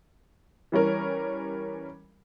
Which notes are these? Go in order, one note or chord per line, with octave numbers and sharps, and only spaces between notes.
E3 G3 C#4 A#4